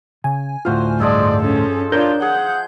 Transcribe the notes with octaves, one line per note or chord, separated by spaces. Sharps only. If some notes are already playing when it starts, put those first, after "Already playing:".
C#3 G#5
D2 A2 F4 F#4 C5 F5
G2 F3 G#3 D5 E6
C#4 A4
D4 F4 A#4 C#5 D5 G6
G#4 F#5